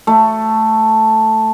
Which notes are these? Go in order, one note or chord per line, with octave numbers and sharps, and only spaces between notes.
A3